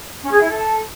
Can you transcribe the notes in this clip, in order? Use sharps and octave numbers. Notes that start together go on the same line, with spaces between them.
C#4
G#4
E4
A4